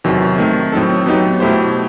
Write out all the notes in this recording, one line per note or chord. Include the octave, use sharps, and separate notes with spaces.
E2 C3 D#3 F#3
D#3 A3 C4
A2 F#3 C4 D#4 A4
F#3 B3 D#4 G4
B2 A3 E4 G4 C5